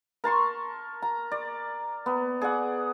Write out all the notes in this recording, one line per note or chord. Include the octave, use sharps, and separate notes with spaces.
A#4 A5 C6 C#6
A#5
D5
B3
G#4 D5 F#5